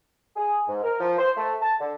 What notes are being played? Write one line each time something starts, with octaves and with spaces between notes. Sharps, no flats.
G#4
G#2
A#4
F3
C5
A3
A5
D3